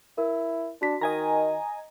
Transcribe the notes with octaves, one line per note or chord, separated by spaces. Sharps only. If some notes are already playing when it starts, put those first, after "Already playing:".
E4 A#4
D4 F#4 B6
D#3 D#5 G#5 A#5